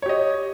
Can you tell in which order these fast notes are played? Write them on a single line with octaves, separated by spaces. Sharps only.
C#5 G4 D#5